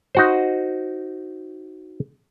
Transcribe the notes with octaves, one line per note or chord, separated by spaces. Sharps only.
D#4 F#4 C5